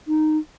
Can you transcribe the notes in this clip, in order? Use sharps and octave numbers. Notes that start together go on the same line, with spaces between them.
D#4